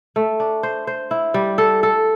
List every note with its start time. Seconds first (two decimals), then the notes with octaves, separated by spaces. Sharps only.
0.16 A3
0.40 D4
0.63 C5
0.87 C5
1.11 E4
1.34 G3
1.58 A4
1.83 A4